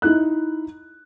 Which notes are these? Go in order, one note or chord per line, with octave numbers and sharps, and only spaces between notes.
D#4 E4 F#6